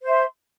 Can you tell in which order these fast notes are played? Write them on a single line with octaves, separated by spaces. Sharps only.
C5 E5 C6